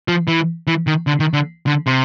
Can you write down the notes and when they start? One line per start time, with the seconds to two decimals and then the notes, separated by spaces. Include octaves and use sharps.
0.08 F3
0.28 E3
0.67 E3
0.87 D#3
1.07 D3
1.20 D#3
1.33 D3
1.67 D3
1.86 C3